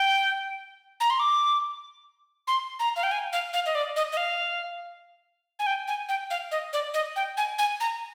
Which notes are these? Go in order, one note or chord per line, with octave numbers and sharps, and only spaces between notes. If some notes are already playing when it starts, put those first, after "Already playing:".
Already playing: G5
A#5
C6
D6
C6
A#5
F5
G5
G#5
F5
F5
D#5
D5
D#5
D#5
F5
G#5
G5
G#5
G5
F5
D#5
D5
D#5
G5
G#5
G#5
A#5